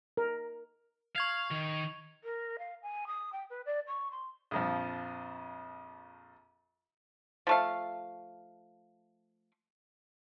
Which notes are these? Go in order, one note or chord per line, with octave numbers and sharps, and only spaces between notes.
A#4
F5 C#6 G#6 F7
D#3
A#4
F5
G#5
D#6
G5
B4
D5
C#6
C6
A#1 F2 F3
F3 A3 F5